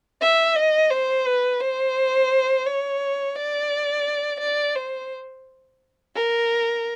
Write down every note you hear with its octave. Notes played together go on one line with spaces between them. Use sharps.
E5
D#5
C5
B4
C5
C#5
D5
D5
C5
A#4